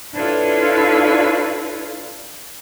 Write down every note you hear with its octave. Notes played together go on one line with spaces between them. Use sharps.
D4 E4 F4 A4 B4 C#5